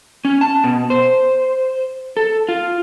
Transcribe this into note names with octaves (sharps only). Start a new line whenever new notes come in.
C#4
A5
B2
C5
A4
F4